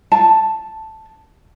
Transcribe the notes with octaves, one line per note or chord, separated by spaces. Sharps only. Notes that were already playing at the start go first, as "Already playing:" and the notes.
A5